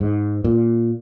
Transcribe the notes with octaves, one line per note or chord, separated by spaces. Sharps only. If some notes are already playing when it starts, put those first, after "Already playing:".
G#2
A#2